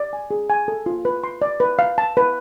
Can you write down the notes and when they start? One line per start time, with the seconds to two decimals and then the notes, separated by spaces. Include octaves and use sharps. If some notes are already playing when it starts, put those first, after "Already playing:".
Already playing: D5
0.13 G#5
0.31 G#4
0.50 G#5
0.68 A4
0.86 F4
1.05 B4
1.24 C6
1.42 D5
1.60 B4
1.79 F5
1.98 A5
2.17 B4